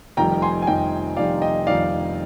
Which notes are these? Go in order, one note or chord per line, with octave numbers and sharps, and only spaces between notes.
F1 F2 D#3 G3 G5 A#5
G#5 C6
G#5
F1 F2 D#3 G3 D#5 G5
F1 F2 D#3 G3 D5 F5
D#5 G5
F1 F2 D#3 G3 D5 F5